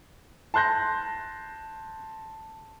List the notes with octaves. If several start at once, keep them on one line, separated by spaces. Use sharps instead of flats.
A5 C6 F#6 G6 A#6